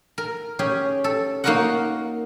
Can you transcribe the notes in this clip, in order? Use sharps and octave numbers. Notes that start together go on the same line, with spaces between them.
A#4
C#4 G4 G#4
A4
A#3 D#4 F#4 A#4 D#5 F#5